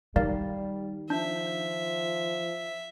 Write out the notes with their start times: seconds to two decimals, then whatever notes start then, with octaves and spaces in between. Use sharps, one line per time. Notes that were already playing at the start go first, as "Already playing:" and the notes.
0.16 D#3 G3 A#4 D5 F5
1.10 F3 D4 E5